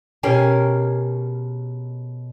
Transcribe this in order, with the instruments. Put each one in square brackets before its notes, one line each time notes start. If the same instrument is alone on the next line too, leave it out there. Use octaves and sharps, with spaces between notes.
[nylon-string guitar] B2 C#4 G4 G#4 A#4